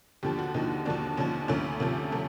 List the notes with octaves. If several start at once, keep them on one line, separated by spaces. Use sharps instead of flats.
D#2 D3 F3 G4
F#4
D#2 D3 F3 D#4
D#2 D3 F3 D4
D#2 D3 F3 C#4
D2 C3 F3 A3 C#4
D2 C3 F3 A3
C3 F3 A3